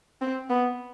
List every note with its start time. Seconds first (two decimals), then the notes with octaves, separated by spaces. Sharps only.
0.22 C4
0.50 B3